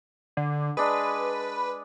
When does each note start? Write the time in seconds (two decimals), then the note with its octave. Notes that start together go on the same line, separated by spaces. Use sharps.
0.37 D3
0.77 G#3 D4 B4